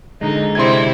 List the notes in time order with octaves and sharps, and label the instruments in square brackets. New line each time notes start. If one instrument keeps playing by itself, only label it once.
[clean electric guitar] D3 G#3 [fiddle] D#4
[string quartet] C3 G3 C4 [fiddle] E4 [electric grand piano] C6 G#6